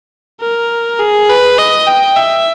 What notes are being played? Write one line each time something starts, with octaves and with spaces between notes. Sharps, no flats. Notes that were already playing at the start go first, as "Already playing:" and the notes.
A#4
G#4
B4
D#5
G5
E5